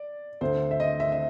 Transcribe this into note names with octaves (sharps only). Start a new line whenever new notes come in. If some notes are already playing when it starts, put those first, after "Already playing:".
Already playing: D5
D2 D3 C5
E5
D#5
E5
E5